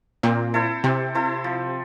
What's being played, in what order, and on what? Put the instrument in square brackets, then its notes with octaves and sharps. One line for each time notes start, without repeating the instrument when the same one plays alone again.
[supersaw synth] A#2 [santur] C4
[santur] E4 A4 C5
[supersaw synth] C3 [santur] C4
[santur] E4 A4 C5
F3